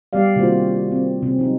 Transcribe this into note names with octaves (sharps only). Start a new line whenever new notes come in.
G3 B3 G4 D5 F5
C3 D#3 A#3 F4 F#4 C5
C4
C3 C4 C#4
F#3 D#4